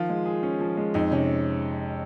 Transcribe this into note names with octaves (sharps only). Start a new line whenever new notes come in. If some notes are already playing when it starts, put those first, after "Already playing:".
Already playing: D#3 F3 F4
G#3
G#4
C#4
F3
G#3
F2 D#4
C3 C#4